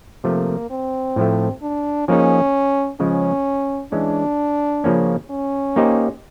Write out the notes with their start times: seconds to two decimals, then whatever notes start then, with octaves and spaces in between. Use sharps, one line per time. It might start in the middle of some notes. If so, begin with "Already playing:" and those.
0.24 C3 F3 A3 A#3
0.70 C4
1.16 A2 F3 A3
1.62 D4
2.08 F3 A#3 C#4 D#4 G#4
3.00 C#3 F3 G#3 C#4
3.92 E3 G#3 C#4 D4
4.84 C#3 F3 A#3 C#4
5.30 C#4
5.76 A#3 D#4 G4 C5 D#5